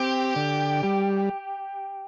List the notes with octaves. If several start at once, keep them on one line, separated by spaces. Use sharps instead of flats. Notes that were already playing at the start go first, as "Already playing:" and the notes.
Already playing: C4 G4
D3
G3